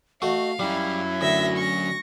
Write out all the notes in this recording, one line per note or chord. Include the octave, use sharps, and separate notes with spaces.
A3 F#4 D#5 F5
F#3 G3 C#4 E4
D2 E5 A#6
C#6 A#6